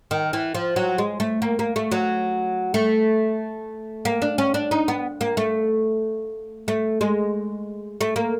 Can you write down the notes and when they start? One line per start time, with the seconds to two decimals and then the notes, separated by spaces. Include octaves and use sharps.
0.11 D#3
0.33 E3
0.55 F3
0.76 F#3
0.98 G#3
1.20 A3
1.42 A#3
1.59 A#3
1.76 A3
1.92 F#3
2.74 A3
4.05 A#3
4.22 D4
4.38 C#4
4.54 D4
4.71 D#4
4.88 B3
5.21 A#3
5.37 A3
6.68 A3
7.01 G#3
8.01 A3
8.16 A#3